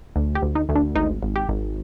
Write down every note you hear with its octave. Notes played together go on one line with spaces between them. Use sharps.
D2
G4
D2
D#4
D2
D4
G#1 D#4
G#1
G4
G#1